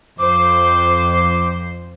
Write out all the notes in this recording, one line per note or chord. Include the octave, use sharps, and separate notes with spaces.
F2 C5 D6